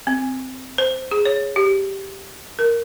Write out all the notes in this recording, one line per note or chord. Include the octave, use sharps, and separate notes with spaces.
C4
C5
G#4
C#5
G4
A#4